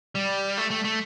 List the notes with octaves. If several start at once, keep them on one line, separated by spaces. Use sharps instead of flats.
G3
A3
A3
A3